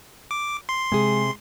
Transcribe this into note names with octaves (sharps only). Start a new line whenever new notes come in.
D6
C6
C3 G#3 G#4